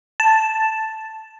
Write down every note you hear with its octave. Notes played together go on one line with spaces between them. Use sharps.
A5